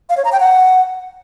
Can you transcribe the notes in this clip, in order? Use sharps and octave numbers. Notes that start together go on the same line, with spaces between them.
F5
C#5
A#5
G5
F#5